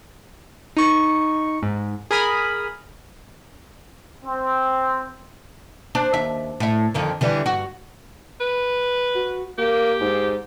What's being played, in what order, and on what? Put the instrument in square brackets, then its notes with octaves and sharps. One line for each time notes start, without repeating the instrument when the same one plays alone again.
[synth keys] D#4 C#6
G#2
G#4 A#4 B5 D#6 F6
[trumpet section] C4
[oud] D4 C5
D#2 E5
A2 E5
F2 D3 D#3
D3 E3 G3
G2 F#4
[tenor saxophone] B4
[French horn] F#4
[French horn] A#3 [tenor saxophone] G4
[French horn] G#2